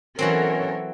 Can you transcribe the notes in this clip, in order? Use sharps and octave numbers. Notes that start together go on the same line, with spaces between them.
B2 E3 F#3 C4 C#4 A4 A#4 C#5